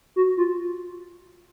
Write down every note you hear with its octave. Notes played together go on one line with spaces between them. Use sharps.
F#4
F4